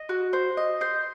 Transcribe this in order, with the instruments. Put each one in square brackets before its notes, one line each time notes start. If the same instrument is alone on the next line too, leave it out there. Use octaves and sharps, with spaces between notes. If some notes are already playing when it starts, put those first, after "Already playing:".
Already playing: [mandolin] D#5
F#4
C5
D#5
C5